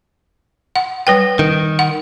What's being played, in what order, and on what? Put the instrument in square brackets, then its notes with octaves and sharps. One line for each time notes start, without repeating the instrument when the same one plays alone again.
[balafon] F#5
G3 B4 G5
[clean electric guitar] D#3
[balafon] F#5